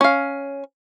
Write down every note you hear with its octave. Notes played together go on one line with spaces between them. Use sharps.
C#4 F5